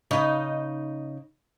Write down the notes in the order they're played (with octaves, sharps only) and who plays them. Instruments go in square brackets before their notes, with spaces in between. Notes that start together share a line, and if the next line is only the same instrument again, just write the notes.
[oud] C#3 D#4 D#5